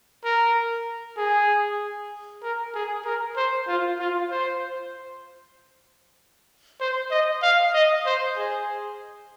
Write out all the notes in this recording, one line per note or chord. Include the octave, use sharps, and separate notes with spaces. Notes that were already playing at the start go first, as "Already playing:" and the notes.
A#4
G#4
A#4
G#4
A#4
C5
F4
F4
C5
C5
D#5
F5
D#5
C5
G#4